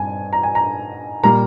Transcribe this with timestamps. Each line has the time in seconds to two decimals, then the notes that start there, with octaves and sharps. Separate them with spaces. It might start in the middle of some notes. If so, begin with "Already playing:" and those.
Already playing: G2 C4 G#5
0.33 A#5
0.43 G#5
0.55 A#5
1.23 A#2 G3 A#3 A#5